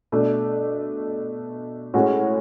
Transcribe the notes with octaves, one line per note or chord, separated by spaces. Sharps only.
B2 A3 D4
A2 G#3 C#4 F#4